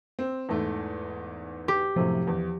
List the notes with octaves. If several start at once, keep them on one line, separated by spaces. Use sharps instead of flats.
C4
E2 G#2 A3
G4
F#2 A2 C3 F3
E2